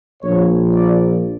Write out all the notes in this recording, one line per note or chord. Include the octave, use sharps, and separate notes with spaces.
A#1 A#2 F3 C#5
D5